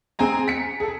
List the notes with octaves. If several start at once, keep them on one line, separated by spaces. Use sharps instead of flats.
C4 G#4 G#5 A#5
B6 C#7
G#4 A4